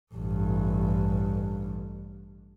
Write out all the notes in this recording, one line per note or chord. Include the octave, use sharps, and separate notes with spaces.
A1 G2